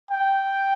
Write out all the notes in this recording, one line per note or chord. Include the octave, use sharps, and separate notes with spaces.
G5